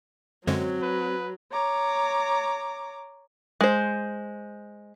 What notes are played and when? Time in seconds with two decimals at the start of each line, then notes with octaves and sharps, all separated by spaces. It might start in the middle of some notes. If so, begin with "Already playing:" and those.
0.47 F#2 D3 F#3 G#3 C4 C#5
0.82 B4
1.51 C#5 A#5 D6
3.61 G#3 C5